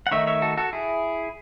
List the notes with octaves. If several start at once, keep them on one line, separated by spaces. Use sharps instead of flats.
F#5
D#3 A3 D#4 C#5 E5
C#5 E5
F#4 A4
F#4 A4
E4 G#4